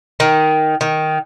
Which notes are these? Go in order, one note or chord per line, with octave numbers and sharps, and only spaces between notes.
D#3
D#3